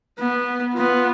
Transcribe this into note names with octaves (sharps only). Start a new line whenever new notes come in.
B3
B3 F4